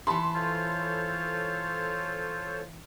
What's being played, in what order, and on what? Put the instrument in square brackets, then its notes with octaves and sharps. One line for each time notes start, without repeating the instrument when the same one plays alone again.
[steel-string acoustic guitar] E3 A5 [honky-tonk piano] B5 C6
[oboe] F4 [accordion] A4 C5 C#5